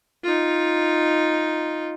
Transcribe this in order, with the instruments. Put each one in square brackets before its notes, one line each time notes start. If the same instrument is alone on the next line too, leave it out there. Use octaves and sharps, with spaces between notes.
[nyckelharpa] D#4 F4